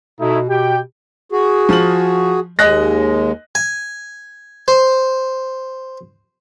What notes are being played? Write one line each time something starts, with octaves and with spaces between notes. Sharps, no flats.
B2 A3 D#4 E4
B2 G4 G5
F#4 G#4
F3 F#7
D#2 G#3 D#5 F#6 A#6
G#5
C5